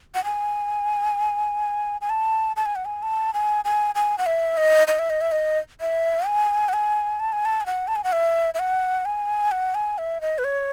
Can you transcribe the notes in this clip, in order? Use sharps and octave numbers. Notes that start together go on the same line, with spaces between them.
F#5
G#5
G#5
A5
A5
G#5
F#5
G#5
A5
G#5
G#5
G#5
F#5
E5
D#5
D#5
E5
D#5
E5
D#5
E5
G#5
F#5
G#5
A5
G#5
A5
G#5
F#5
A5
G#5
F#5
E5
E5
F#5
G#5
F#5
G#5
E5
D#5
B4
C#5